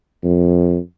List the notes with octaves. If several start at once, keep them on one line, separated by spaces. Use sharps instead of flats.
F2